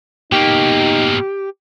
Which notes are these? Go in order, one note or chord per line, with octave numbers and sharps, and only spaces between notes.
B2 A#3 D#4 G4